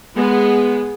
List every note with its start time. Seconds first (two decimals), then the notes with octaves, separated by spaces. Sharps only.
0.16 G#3 B3 G#4